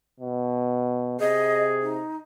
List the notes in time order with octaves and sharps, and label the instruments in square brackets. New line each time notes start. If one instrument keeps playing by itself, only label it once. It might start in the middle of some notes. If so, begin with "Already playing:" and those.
[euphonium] B2
[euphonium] C3 [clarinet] G#4 [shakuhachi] D#5
[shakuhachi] D#4